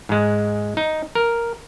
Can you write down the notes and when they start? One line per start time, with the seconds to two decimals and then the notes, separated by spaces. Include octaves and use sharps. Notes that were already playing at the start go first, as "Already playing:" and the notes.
0.09 G#2 G#3
0.77 D#4
1.15 A#4